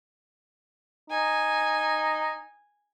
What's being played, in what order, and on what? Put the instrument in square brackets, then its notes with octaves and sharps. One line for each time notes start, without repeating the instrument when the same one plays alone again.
[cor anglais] D#4 [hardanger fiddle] G#5